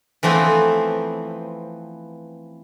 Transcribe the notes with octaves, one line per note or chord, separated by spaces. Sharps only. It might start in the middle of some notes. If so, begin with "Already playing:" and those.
E3 F3 A3 B3 C4